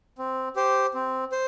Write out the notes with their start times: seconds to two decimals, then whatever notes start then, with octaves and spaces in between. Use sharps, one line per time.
0.18 C4
0.56 G4 C5
0.94 C4
1.32 C5